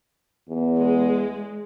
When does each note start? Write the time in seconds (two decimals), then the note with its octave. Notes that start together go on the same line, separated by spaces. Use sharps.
0.49 E2
0.78 G#3